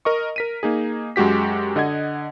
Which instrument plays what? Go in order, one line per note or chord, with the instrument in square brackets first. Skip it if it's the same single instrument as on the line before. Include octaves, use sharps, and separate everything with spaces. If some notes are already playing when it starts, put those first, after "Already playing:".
[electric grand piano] A#4 D#5 C#6
A#4 B6 D#7
A#3 D#4 G#4
F#2 G#3 F#4 G4 B6
D3 D#5 F#5 G#6